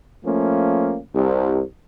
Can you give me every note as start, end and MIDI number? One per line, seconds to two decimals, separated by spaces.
0.25 0.98 53
0.25 0.98 57
0.25 0.98 58
0.25 0.98 61
1.14 1.61 36